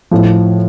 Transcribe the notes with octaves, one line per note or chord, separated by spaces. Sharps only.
A2 F3